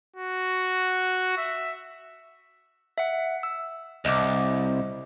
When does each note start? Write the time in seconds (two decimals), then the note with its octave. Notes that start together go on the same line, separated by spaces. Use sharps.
0.16 F#4
1.38 E5
2.98 E5 F#5
3.43 E6
4.05 C2 D#5 D6